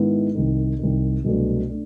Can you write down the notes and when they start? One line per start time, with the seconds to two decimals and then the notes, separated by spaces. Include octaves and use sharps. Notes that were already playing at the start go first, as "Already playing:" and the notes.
Already playing: G#2 D#3 G#3 B3 E4
0.35 C2 C3 D#3
0.79 C2 C3 D#3
1.24 C2 B2 F#3 A3 D4
1.69 A3 D4